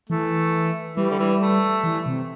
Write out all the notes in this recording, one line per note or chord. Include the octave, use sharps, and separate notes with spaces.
E3 A3
E3 G3
D3
E3
A3
E3
C3